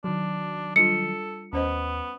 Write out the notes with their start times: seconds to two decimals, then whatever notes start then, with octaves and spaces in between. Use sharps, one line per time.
0.04 D#3 F#3 D4
0.76 G3 D4 F4 A4 C#7
1.53 D#2 B3 C#4 C5 D#5